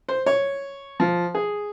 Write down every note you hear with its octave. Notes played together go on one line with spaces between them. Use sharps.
C5
C#5
F3
G#4